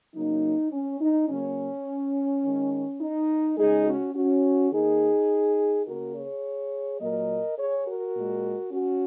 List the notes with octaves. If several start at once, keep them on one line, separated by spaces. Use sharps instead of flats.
C#3 F#3 A#3 D#4
C#4
D#4
C#3 F#3 A#3 C#4
D#3 G#3
D#4
C#3 G#3 D#4 G#4
C#4 F#4
C#4 F#4
D#3 A#3 D#4 G#4
C#3 A#3 F#4 A#4
G#4 C#5
A#2 F#3 A#3 A#4 D#5
G#4 C#5
F#4 A#4
A#2 G#3
C#4 F#4